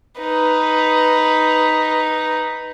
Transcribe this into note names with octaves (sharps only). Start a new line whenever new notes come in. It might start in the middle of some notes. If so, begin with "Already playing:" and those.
D#4 B4